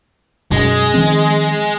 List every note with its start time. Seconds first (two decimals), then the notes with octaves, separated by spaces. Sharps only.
0.52 F#2 B2 G#3
0.94 D#3 F3 C4